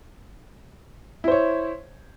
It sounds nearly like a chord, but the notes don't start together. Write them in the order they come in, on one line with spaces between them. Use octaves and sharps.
E4 C5 C#5